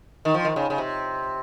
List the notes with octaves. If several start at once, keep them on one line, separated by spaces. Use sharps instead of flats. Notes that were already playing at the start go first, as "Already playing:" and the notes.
D#3
F3
D#3
C#3
C#3
C3